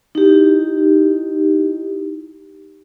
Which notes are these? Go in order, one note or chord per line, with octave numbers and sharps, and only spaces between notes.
D#4 E4 G4